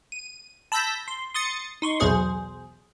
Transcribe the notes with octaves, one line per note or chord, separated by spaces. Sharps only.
D#7
A5 B5 E6 G6 A#6 B6
C6
C6 D#6 A6 C#7
D#4 C6 C#6
B1 E2 B2 G#4 C5